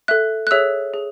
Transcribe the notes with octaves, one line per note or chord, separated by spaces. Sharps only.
A4 E5 F#6
F#6
G#4 C#5 E5 E6
G#4